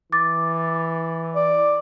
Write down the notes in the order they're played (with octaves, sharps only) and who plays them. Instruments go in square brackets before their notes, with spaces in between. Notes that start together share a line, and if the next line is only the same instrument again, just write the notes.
[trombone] E3 [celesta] D6 A6
[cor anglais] D5